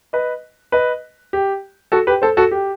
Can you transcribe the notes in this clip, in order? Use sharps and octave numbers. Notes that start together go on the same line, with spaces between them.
B4 D#5
B4 D#5
G4
F#4 A4
G4 B4
A4 C5
F#4 A4
G4